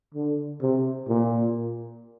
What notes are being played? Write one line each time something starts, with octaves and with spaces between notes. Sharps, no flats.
D3
C3
A#2